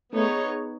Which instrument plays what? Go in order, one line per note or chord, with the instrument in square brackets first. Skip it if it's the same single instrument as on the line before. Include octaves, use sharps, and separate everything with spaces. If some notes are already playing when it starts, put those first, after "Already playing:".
[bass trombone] A3 [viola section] B3 D#4 G#4 C#5